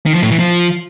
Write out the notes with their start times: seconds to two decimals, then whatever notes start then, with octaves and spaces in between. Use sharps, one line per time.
0.06 D#3
0.14 F3
0.23 A2
0.31 E3
0.39 F3